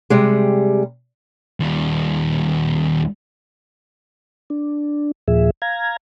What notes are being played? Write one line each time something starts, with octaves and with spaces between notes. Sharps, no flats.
C3 G3 G#3
D#2 G3
D4
D#2 A#2 F3 G#4 E5
F5 A#5 G#6